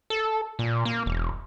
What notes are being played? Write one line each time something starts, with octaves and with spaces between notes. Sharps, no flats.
A4
A#2
A#3
E1